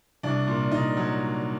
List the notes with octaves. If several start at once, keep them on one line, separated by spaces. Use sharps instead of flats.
C2 D4
A#2
C2 D#4
F#3